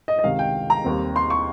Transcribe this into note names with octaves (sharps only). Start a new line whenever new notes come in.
D#5
D#5
C#2 C3 D#3 F5
G5
A#5
D#2 D#3 G3 C4
C6
C#6